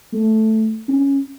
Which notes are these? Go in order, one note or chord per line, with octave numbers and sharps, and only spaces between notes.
A3
C#4